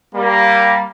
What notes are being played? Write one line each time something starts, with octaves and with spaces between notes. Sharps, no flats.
G3 A#3